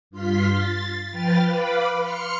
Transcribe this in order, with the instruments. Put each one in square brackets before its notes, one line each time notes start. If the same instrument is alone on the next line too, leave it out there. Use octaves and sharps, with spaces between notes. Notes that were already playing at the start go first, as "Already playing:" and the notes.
[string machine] G2 F4 F5 C6 B6
A6
F3 B4 G5 F6 A6
B4 F5 B5 D6
C6 F6 C#7